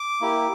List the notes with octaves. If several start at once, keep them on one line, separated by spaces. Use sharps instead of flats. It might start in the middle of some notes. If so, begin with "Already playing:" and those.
Already playing: D6
A#3 E4 G4